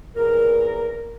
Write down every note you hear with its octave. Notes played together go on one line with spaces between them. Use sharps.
E2 A#2 A#4